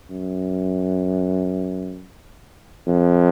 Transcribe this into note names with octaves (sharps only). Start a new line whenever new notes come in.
F#2
F2